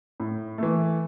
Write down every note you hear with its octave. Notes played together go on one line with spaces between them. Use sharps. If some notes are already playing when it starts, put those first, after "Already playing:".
A2
E3 A3